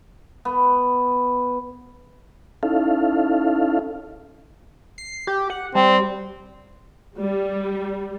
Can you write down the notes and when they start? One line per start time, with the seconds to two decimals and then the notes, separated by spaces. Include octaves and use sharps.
0.45 B3
2.63 C#4 D#4 E4 A4 F5
4.98 C7
5.27 G4
5.50 F#5
5.75 G3 C4
7.18 G3